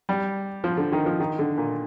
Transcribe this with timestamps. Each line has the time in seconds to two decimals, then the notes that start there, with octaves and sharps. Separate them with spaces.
0.09 G3
0.64 F3
0.77 D3
0.92 D#3
1.06 F3
1.20 D#3
1.39 D3
1.58 A#2